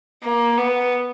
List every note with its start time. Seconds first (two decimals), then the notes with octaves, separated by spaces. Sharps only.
0.23 A#3
0.57 B3